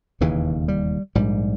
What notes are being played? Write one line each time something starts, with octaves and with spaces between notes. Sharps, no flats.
E1 D#2 C#3 E3
G3
A#1 G#2 G3